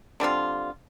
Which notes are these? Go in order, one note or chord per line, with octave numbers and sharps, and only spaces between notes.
D3 G3 C4 F4